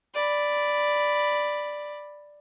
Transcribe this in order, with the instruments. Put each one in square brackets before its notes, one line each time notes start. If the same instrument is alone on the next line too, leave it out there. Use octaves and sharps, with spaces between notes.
[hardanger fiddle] D5 B5